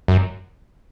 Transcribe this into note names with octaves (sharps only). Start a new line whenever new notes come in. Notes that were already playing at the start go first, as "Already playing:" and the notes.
F#2